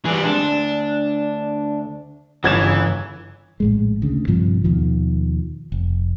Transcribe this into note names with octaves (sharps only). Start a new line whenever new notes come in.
E3 G3 G#4 D5
G#3 C4 D4
D2
G1 C#3 E3 F3 G#6 E7
C#3
A#1 A2 G#3
D2 C#3
A#1 G2 C3 F3
D#2 B2 D#3 F3
F1